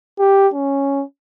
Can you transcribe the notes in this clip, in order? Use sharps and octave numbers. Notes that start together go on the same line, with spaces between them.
G4
C#4